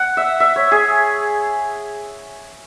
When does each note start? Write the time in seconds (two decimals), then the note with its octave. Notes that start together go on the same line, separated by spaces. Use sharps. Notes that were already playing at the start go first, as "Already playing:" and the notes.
Already playing: F#5
0.17 E5
0.40 E5
0.56 C#5
0.71 G#4